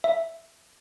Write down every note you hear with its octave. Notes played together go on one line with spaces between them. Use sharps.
E5